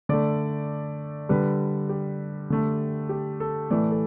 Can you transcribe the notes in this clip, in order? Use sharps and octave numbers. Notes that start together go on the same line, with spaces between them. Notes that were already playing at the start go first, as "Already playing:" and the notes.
D3 A3 D5
D3 G3 B4
G4
D3 A3
G4
A4
A2 E3 A3 D5
A4